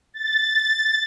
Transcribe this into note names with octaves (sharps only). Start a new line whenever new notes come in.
A6